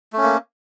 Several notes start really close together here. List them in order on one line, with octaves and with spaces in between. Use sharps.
A3 C#4 A#3